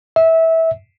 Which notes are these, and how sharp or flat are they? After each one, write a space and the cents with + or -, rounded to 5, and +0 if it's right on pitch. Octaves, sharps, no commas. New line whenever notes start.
E5 -20